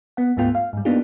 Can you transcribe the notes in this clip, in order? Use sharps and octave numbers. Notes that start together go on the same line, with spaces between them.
B3 F#5
D2 G#2 A3 B3 F4 G5
F5
G#2 G3
A#3 B3 D4 D#4 F4 G4